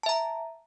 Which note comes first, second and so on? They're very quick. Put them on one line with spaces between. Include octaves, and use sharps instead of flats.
A5 E5 A#5